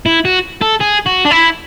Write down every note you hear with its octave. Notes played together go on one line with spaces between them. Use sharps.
E4
F#4
A4
G#4
F#4
D4
E4